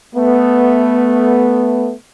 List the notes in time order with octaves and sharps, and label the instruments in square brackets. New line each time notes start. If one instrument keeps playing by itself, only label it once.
[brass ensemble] A3 B3